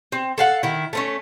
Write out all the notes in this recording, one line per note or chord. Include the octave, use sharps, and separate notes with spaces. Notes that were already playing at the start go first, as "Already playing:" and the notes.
C4
A4 F5 F#5
D#3 E4
A3 C4 C#4